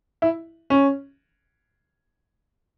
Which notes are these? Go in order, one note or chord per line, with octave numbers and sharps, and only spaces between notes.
E4
C#4